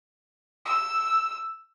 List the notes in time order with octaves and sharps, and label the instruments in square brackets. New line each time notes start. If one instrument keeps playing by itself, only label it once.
[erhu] E6